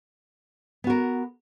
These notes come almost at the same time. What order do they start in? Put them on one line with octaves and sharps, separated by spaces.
B3 F#4 A#4